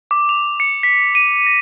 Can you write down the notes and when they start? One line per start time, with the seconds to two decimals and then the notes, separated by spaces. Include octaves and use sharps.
0.11 D6
0.29 F7
0.60 C#7
0.83 B6
1.15 D#7
1.46 A#6